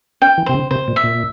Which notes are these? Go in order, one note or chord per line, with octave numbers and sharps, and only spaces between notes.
C#4 G5
E3
C3 C5
C#3
C3 C5
A#2
E5
A#2